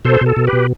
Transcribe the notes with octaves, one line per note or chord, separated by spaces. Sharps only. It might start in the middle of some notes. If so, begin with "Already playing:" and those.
B2 A4 C5
B2
A4
B2
G4 B4
B2